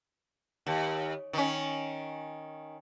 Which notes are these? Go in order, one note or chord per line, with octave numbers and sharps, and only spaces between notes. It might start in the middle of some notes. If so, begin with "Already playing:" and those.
D#2
D#3 C#4